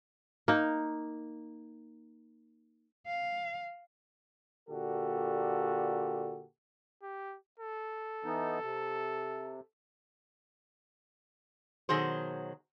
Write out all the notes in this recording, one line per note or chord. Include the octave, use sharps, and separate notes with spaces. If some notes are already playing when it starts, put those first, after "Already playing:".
A#3 D#4
F5
A#2 D3 F#4 G4 A4
G4
A4
E3 B3 D#4
C3
B2 D#3 F#3 G#4 C5